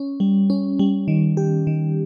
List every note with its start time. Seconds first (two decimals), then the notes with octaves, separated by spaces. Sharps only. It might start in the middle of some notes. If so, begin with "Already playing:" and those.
Already playing: C#4
0.20 G3
0.50 C#4
0.79 G3
1.08 D#3
1.37 G4
1.67 D#3